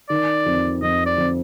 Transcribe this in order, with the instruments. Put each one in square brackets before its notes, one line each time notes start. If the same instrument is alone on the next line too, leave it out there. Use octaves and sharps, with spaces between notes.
[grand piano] D#3 [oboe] D5
[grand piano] F2
[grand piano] F2 [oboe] D#5
[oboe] D5
[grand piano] F2